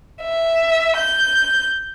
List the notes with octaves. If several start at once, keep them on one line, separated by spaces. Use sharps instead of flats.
E5
G6